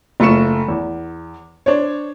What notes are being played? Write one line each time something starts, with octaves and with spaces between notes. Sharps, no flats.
F#1 A3 F4 C#6 C#7 E7
E2
D4 C5 C#5